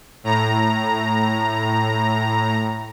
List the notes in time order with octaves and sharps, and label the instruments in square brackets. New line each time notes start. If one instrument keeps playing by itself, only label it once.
[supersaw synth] A2 A#5